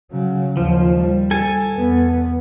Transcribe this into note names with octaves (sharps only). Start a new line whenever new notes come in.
C#3 F#3
D#2 F3
G3
A4 G#5
E2 B3